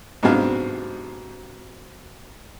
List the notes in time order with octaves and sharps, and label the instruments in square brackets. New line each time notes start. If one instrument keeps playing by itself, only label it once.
[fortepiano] G#2 C3 F#3 B3 D4 F5